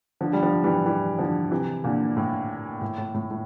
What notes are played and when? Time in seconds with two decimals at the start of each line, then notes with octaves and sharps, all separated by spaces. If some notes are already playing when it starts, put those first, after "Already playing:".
0.21 D3 F3
0.33 G3
0.43 D3 F3
0.64 E3 G3
0.86 E3 G3
1.19 D3 F3
1.51 C3 E3
1.84 A#2 D3
2.17 A2
2.82 A2
2.98 A2
3.14 A2
3.31 A2